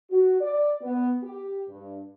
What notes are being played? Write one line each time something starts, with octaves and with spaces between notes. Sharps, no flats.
F#4
D5
B3
G4
G2